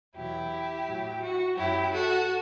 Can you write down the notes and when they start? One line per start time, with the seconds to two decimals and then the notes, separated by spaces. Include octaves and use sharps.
0.15 E2 B2 F#3 E4 G4
0.87 A2 F#3
1.22 F#4
1.57 F#2 F#3 E4 G4
1.93 F#4 A4